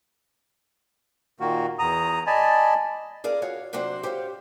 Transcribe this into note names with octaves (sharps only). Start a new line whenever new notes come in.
A#2 D#3 A#3 F#4
E2 A#5 D#6
D5 D#5 G#5 A5 B5
G#4 A#4 D5 F5
F#4 C#5 F5
C3 F#3 D4 F#4 C5
G4 C5 C#5 F5